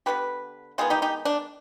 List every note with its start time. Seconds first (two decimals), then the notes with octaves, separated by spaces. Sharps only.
0.06 D3 G#3 B3 G4 B4
0.78 D#3 G#3 B3 F4 G#4
0.90 D#4 G4
1.02 D#4 G4
1.25 D4